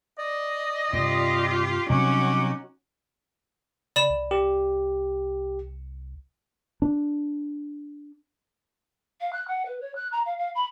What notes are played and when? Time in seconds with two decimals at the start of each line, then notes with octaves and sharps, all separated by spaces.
0.18 D5 D#5
0.93 G2 C3 F4 G4
1.90 C3 F#3 G3 C#4 D#4 F#4 D6
3.96 C#3 D5 B5 E7
4.10 C2
4.31 G4
6.82 D4
9.21 F5
9.33 F#6
9.48 F#5
9.65 B4
9.81 C#5
9.95 F#6
10.12 A#5
10.26 F5
10.38 F5
10.55 B5